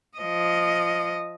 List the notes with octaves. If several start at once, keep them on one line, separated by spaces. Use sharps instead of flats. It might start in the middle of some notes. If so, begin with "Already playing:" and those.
F3 D#5